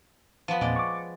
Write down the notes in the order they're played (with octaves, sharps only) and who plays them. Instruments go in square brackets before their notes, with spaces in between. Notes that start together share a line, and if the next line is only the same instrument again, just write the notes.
[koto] F3 B3
[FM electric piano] E2 A#2 C4 [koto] G#3 D5
[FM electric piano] C#6 D6